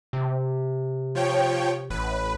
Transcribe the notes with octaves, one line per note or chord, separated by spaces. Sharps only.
C3
F3 C#5 G5
A1 B4